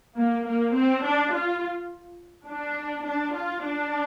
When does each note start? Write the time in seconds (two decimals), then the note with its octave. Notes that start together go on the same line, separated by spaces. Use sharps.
0.17 A#3
0.47 A#3
0.75 C4
1.03 D4
1.33 F4
2.47 D4
3.06 D4
3.35 F4
3.63 D4